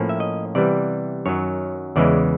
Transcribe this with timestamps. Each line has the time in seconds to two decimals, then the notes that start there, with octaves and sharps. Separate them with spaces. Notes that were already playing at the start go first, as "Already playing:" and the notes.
Already playing: A2 F3 A#3 C#4
0.09 E5
0.20 D#5
0.55 C3 E3 G3 B3 D5
1.26 F#2 D#3 F#3 C#5
1.96 E2 C#3 E3 G#3 D5